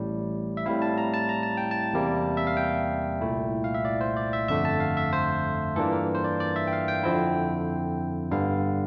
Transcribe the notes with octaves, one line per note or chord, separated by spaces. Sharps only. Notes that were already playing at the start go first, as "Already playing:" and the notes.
Already playing: A1 A2 G3
E5
A2 G3 C4 E4 F5
A5
A#5
A5
A#5
A5
G5
A5
E2 C3 G3 A#3
E5
F5
G5
C2 A#2 A3 E4
F5
E5
D5
C5
D5
E5
G1 F2 D3 A3 E5
A5
F5
E5
C5
G2 E3 A#3 D4 F4 A4
A#4
C5
D5
D5
E5
G5
F5
G5
F2 D3 F3 C4 E4
G1 G2 D3 G3 F5